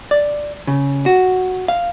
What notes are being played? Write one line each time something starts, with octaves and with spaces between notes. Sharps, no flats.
D5
C#3
F#4
F5